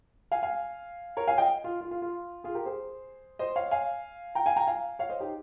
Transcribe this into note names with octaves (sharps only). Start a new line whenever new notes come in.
F5 G#5
F5 G#5
A#4 C#5
F5 G#5
D#5 G5
F4
F4
F4
F4
F4 G#4
G4 A#4
G#4 C5
C5 D#5
C#5 F5
F5 G#5
G5 A#5
F5 G#5
G5 A#5
F5 G#5
C#5 F5
C5 D#5
D#4 G4